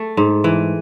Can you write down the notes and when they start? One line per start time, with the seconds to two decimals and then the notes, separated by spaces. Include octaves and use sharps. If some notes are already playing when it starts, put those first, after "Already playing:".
Already playing: A3
0.17 G#2
0.44 E3